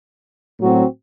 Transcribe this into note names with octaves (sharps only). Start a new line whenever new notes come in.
A2 F#3 C4 F#4